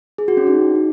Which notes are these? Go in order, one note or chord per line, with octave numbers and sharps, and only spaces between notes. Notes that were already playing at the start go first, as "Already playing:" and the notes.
G#4
F#4
C#4
D#4
D#4